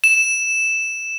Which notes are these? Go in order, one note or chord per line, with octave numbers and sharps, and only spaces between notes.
E7